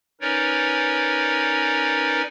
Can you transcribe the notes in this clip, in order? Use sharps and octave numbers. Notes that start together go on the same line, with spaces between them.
C#4 D#4 A#4 B4 C#5 D5